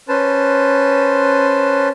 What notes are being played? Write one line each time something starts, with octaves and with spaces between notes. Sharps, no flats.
C#4 B4 C5 A5